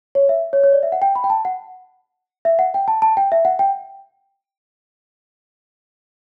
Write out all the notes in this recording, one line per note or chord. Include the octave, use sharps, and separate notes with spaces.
C#5
E5
C#5
C#5
D5
E5
F#5
G5
B5
G5
A5
F#5
E5
F#5
G5
A5
A5
G5
E5
F#5
G5